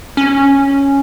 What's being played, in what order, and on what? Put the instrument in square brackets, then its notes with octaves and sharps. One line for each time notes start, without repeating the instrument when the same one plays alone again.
[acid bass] C#4